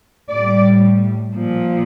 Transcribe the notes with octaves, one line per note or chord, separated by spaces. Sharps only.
A2 G3 D5
A#2 F3